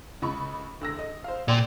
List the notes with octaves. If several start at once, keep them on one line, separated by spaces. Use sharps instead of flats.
C#2 B5 C#6
D2 E6 A#6
D#5
C5 F5
A#2 D5 G5 C6